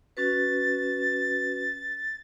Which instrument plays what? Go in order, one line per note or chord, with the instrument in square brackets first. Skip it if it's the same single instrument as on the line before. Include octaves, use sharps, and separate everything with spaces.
[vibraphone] C#4 F#4 B4 [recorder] A6